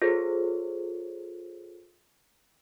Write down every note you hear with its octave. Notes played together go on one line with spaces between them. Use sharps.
F4 G#4 A4 C5 C#5